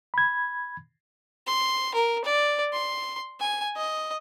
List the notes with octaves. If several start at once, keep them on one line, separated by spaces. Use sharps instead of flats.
B5 G#6
C6
A#4
D5
C6
G#5
D#5